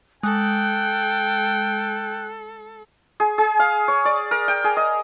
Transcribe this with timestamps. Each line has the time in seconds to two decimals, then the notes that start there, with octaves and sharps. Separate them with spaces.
0.23 G#3 A4 G5 F#6
3.20 G#4
3.38 G#4
3.59 F5
3.88 C#5
4.05 D5
4.31 A#4
4.48 G5
4.64 G#4
4.77 D#5